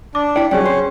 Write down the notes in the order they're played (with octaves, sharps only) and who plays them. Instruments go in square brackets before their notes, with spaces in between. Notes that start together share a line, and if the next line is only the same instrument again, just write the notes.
[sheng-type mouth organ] D4 [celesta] D6
[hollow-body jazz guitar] E4 D5 [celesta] G5
[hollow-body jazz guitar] G2 C3 F#3 [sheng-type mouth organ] C#4 [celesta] G#4 C#5 G5
[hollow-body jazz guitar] C5